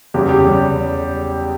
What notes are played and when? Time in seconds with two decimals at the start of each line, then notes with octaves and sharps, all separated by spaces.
0.14 E2 C#3 G3 G4
0.29 G4
0.45 E2 C#3 G3